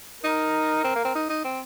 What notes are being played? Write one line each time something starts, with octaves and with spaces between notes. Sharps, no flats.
D#4 A#4
C4
A#3
C4
D#4
D#4
C4